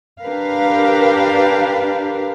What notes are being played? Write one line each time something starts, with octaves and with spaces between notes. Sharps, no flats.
D4 G4 A#4 B4 F5